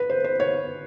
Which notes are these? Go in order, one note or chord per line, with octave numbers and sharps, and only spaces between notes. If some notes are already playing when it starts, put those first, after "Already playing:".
Already playing: B4
C5
C5
C#5